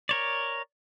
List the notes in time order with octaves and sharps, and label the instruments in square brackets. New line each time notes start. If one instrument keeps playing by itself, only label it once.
[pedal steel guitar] A#4 C#5 D5